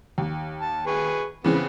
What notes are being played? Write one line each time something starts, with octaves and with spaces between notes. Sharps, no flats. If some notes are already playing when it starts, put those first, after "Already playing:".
D#2
A5
G#4 B4 C#6
C#3 E3 B3 C4